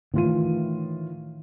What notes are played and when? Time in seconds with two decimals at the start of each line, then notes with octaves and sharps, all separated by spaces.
0.14 A2 D#3 E3 F4 D#7